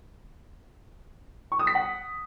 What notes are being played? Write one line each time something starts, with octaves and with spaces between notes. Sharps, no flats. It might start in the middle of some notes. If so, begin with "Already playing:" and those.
C#6
D#6
B6
F#5